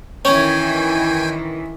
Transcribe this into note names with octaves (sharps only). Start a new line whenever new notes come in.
D#3 E3 C#4 C#5 G5 G#5